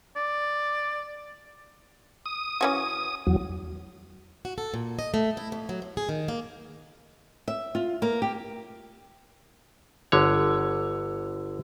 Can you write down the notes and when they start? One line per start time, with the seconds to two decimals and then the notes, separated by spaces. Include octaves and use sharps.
0.16 D5
2.26 D#6
2.61 E3 C#4 F#4
3.27 E2 F#3
4.45 F#4
4.58 A4
4.74 A#2
4.99 D#5
5.14 A3
5.37 E4
5.52 F2
5.69 F#3
5.82 A2
5.97 G#4
6.09 D#3
6.28 A#3
7.48 E5
7.75 F4
8.02 A#3
8.22 G4
10.12 G1 D3 C#5